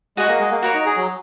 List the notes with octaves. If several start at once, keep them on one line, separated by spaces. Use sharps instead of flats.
G#3 F#4 D#5 F#5 C#6
A#3
G#3
A#3
A#3 F#4 A#4 C#5
D#4
G#4
F#3